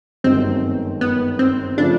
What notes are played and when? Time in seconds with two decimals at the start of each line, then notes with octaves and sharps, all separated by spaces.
0.24 G1 F#2 D#3 G#3 C4
1.01 B3
1.39 C4
1.77 C#3 F3 A3 D4